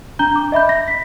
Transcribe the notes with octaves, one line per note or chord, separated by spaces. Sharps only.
D4 A#5 G6 G7
D6
D#5 E5 B5 G6
A#6
B6